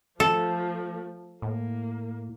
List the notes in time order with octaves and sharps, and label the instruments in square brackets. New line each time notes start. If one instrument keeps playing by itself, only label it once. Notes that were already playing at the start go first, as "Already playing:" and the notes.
[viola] F3 A3 [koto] A4
[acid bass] A2 [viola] A#3